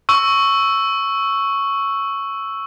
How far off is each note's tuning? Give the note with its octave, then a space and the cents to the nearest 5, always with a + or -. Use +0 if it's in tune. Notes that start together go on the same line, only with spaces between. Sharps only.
C#6 +0 E6 +0